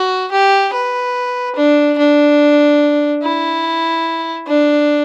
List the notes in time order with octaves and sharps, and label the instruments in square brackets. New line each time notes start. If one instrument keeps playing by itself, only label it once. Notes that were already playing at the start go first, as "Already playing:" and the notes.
Already playing: [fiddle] F#4
G4
B4
D4
D4
E4
D4